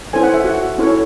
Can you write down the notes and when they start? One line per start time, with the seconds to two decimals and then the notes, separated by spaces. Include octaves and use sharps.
0.13 C#4 E4 A4 C5 G#5
0.23 F#5
0.34 E5
0.44 F#4 F#5
0.78 C#4 E4 A4 C#5